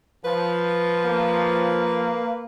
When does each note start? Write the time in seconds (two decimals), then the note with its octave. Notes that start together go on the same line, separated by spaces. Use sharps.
0.25 F3 B4
1.05 A#3